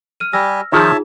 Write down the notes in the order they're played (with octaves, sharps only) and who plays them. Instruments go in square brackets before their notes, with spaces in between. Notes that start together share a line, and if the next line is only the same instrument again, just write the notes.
[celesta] F6 D#7
[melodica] G3 G4 G#5 [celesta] E6 F6 A#6
[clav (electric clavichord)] D#3 F3 [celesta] D#4 F4 G#4 [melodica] C#5 E5 A5